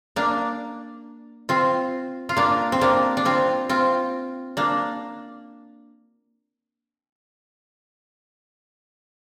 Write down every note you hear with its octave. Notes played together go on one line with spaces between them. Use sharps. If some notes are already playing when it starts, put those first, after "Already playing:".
A#3 D4
C4 F4
F4
A#3 D4
C4
A#3 D4
D4
C4 F4
C4 F4
A#3 D4